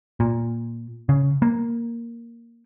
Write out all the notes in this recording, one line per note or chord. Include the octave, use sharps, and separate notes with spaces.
A#2
C#3
A#3